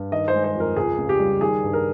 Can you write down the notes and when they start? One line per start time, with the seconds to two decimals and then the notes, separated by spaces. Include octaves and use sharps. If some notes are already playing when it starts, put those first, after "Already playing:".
Already playing: G2
0.12 D#3 D#5
0.28 C5
0.34 G#3
0.44 C5
0.55 F2
0.60 A#4
0.77 C#2 G#4
0.99 C#3
1.09 G4
1.20 G3
1.41 D#3 G#4
1.63 G2
1.73 A#4